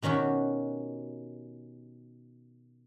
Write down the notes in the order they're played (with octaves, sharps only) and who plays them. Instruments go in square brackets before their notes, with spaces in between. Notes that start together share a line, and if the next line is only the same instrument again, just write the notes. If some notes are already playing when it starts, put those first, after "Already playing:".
[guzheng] B2 D#3 C#4 F#4 G4